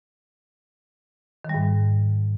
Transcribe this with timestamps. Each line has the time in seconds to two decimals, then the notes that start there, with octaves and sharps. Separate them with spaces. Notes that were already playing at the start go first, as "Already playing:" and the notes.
1.45 D#3
1.49 G3
1.54 G#2